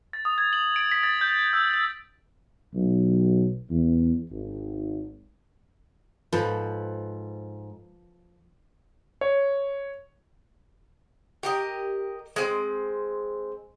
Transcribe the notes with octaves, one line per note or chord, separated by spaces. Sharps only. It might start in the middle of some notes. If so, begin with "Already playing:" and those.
A6
D#6
G#6
F#7
D7
B6
A6
G6
F#7
E6
A6
B1
E2
G#1
G#2 F3 A4 B4
C#5
G4 A#4 D#5
G#3 C4